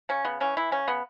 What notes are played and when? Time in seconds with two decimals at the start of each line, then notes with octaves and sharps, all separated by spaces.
0.09 C#3 C#4
0.25 C#3 B3
0.40 E3 C#4
0.57 E3 E4
0.72 C#3 C#4
0.87 C#3 B3